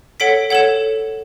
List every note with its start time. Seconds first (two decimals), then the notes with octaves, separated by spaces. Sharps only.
0.20 A4 C#5 F#5 B6 D7
0.50 A4 C#5 F#5 E7